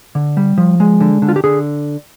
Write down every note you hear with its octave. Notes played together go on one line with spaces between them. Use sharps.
D3
G3
F3
G#3
D3
D3
F4
G4
D3 G#4